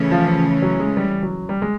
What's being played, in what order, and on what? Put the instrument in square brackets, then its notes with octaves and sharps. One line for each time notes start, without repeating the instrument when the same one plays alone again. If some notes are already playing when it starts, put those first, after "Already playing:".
Already playing: [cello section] C#3 E3 A3 C#4
[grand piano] F3
F3
F#3
G#3
G3
F#3
G3
G#3